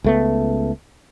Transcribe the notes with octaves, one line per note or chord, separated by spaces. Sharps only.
C#2 A3 B3